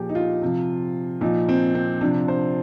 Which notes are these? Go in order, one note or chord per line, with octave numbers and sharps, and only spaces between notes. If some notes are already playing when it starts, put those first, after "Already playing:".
Already playing: A#2 F3 G4 G#4
D#4
F4
C3 F3
A#2 F3 D#4
C4
C4
C3 F3 D4
C5